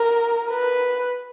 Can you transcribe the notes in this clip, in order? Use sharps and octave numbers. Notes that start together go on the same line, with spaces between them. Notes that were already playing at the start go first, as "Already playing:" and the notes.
Already playing: A#4
B4